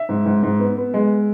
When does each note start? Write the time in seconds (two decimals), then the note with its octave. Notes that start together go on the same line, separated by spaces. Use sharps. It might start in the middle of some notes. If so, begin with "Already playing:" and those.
Already playing: E5
0.09 G#2
0.26 G#2
0.43 G#2
0.59 B3
0.77 B3
0.94 G#3